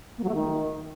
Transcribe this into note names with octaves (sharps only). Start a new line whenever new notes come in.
A#3
F#3
A3
D#3